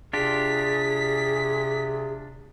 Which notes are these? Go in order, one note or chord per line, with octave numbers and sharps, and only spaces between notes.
C3 D4 F4 G4 G#4 B6